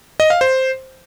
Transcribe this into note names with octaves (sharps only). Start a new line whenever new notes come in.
D#5
F5
C5